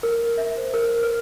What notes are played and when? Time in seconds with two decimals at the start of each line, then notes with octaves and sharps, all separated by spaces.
0.03 A#4
0.37 E5
0.57 C5
0.74 A#4
1.03 B4